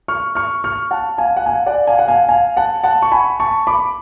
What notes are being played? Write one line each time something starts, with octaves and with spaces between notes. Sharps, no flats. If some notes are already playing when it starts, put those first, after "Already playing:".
C#6 F6
C#6 F6
C#6 F6
F#5 A5
F5 G#5
F#5
F5 G#5
D5 F#5
F5 G#5
F#5
F5 G#5
F5 G#5
F#5 A5
F#5 A5
C#6
G#5 B5
A5 C#6
B5 D6